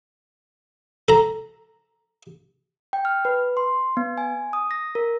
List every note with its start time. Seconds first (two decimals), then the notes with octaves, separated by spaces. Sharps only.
1.08 A4 A#5
2.93 G5
3.05 F6
3.25 B4
3.57 C6
3.97 B3
4.18 G#5
4.53 D#6
4.71 A#6
4.95 A#4